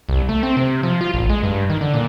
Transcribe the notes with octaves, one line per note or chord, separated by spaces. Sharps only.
C2
A3
C4
C3
F3
F4
A1
G#3
G2
D#3
D3
A#2